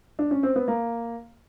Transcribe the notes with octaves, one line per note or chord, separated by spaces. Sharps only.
D4
C#4
C4
B3
A#3